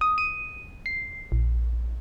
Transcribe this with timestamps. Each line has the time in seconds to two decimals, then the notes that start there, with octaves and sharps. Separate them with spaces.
0.01 D#6
0.18 D#7
0.86 C7
1.32 A#1